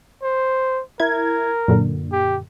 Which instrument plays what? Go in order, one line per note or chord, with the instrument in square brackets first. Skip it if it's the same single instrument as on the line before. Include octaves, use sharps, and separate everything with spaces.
[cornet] C5
[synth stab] E4 G#6 [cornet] A#4
[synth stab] F#2 A#2 D3
[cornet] G4